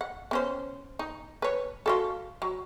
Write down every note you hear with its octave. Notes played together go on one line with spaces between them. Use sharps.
F#5
B3 C#4 C5
D#4
B4 C#5
F4 F#4 A4
F#3